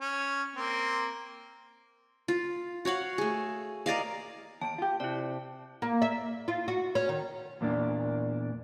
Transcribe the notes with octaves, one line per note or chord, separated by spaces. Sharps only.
C#4
A#3 C4
F4
F#4 C#5 F5 F#5
A3 G#4
A#4 D5 D#5 F5
D#2 A5 D7
F4 G4
C3 E4 D5
A#3
E5
F4
F#4
C#4
D#3
E2 A#2 A#3 D4